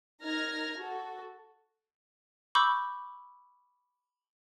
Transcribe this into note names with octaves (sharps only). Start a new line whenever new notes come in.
D#4 A#4 F6 G#6 A#6
F#4 A4
B5 C#6 D6 E6 G6